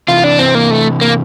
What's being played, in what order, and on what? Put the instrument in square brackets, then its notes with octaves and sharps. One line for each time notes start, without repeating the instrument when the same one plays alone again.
[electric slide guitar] C3 E3 [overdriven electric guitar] F4
[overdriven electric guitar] D4
C4
A#3
A3
A#3